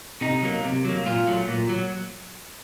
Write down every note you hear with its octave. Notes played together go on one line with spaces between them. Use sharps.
C3 D#4
F#3 A#3
C3
F#3 A#3
A#2 F4
F#3 A3
A#2
F#3